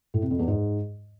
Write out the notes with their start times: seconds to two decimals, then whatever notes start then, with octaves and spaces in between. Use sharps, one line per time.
0.14 A2
0.22 C3
0.31 F2
0.39 E2
0.48 G#2